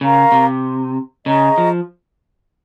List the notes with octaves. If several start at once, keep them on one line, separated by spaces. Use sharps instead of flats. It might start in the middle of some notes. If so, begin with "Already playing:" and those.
C#3 A#4 F5 A#5 C#6
C3
C#3 G#4 D#5 A#5 C#6
F3